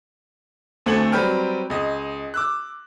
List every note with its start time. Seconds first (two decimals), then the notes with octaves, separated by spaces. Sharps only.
0.86 D2 A3 C4 A4 G#5 F#7
1.12 F#3 G3 C4 B4 G5 F6
1.70 C#2 D#5
2.34 D6 E6 F#6